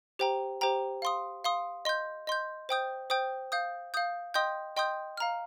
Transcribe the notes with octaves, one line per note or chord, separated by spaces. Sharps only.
G4 C5 G5 A#5
G4 C5 G5 A#5
F5 C6 D#6
F5 C6 D#6
D#5 C6 G6
D#5 C6 G6
C5 G5 D#6 G6
C5 G5 D#6 G6
F5 D#6 G6
F5 D#6 G6
D#5 G5 C6 D#6 G6
D#5 G5 C6 D#6 G6
F5 A#5 F6